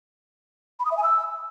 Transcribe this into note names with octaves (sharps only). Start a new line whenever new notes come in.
B5
D#6
E5
G#5
E6